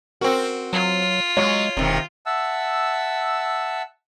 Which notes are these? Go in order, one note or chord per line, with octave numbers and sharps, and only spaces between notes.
C4 F#4 A#4
F#3 F4
F#3 G#3 C#5 C#6
E1 C3 D#3
E5 F#5 A5 E6